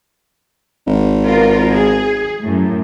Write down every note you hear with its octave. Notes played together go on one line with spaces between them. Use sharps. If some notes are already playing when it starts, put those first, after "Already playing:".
G#1
B3 F4 A#4
G#4
F#2 A2